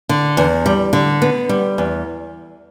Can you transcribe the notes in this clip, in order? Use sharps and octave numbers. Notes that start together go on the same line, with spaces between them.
D3
E2
G3
D3
B3
G3
E2